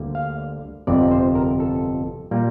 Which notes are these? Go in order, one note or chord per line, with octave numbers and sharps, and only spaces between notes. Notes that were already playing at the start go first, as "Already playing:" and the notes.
Already playing: D2 D3 G3 A#3
F5
G1 F2 C3 D5
C5
A#4
A4
A#2 G3 A#3